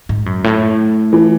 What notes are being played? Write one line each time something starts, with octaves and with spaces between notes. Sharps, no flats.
G#2
F#2
A2
E3